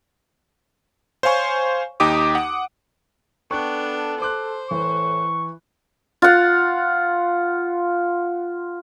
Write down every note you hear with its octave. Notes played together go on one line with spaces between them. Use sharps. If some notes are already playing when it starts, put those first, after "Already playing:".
C5 C#5 F5 G#5 C#6
D#2 D#4 G4 D6 D#6
F#5
B3 D4 A4 G5 C#6 F#6
C5 C6 D6 F#6
A2 E3 C#6
F4 F#5